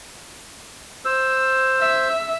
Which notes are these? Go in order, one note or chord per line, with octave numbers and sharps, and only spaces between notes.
C5 E6
E5